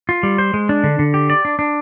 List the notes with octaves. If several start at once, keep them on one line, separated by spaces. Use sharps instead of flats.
F4
G3
C5
G#3
D4
D3
D3
G4
D5
D4
D4